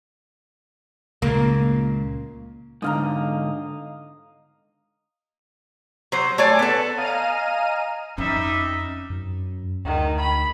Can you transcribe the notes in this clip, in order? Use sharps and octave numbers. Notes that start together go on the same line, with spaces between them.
C#2 A#2 C#3 A#3
G#2 D3 D#5 F5 A#5
F#3 C5
A3 C#5 D5 G#5
B3 A4
D#5 F5 G#5 A#5 F6 D#7
F2 G3 C#4 D#4 E5
F#2
D2 D#3
B5